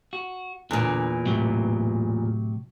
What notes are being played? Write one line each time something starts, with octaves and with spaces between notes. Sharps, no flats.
F#4
E2 A#2 D3
A2 C3 F#3